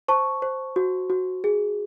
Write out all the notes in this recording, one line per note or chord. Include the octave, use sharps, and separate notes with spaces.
C5 A5 C#6
C5
F#4
F#4
G#4